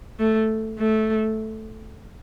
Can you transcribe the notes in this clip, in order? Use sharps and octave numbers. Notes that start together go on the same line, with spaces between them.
A3
A3